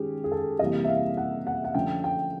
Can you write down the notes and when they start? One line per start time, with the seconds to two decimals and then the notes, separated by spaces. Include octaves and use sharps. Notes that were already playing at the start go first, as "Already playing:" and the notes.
Already playing: D#3 G#3 C#4 G4 G#4
0.24 G#4
0.32 A4
0.59 C3 E3 G3 A#3 D#5
0.84 E5
0.88 F5
1.17 F#5
1.47 F#5
1.64 F#5
1.74 D3 F3 A3 C#4 G5
2.04 G5